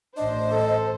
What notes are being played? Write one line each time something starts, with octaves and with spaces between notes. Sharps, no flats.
A1 D4 C5 D#5
A4